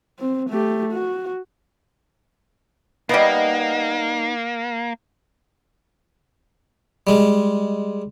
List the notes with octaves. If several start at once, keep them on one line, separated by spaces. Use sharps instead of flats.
C4
A3 G4
F#4
G3 A#3 B3 D#4 D#5
G3 G#3